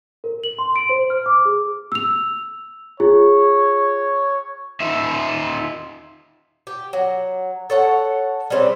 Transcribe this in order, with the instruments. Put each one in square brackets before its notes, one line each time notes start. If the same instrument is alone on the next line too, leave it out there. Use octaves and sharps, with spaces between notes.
[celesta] A#4
F#7
C6
D7
C5
F6
D6
G#4
E6 F7
[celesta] F4 G#4 [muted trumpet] C#5
[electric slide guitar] D#4 F4 E5
[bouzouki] G4
F#3
A4 C#5 F#5
G3 G#3 C4 C#4